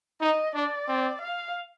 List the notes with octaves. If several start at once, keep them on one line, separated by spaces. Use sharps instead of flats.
D#4 D#5
D4 D5
C4
F5